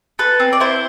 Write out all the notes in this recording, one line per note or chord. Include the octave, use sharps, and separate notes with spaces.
A4 B4
C4
D5
E4 C5